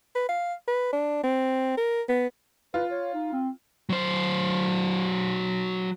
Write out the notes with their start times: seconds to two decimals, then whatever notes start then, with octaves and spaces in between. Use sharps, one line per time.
0.15 B4
0.29 F5
0.68 B4
0.93 D4
1.23 C4
1.77 A#4
2.09 B3
2.74 F4 B4
2.91 C#5
3.14 D#4
3.33 C4
3.89 F#3 C5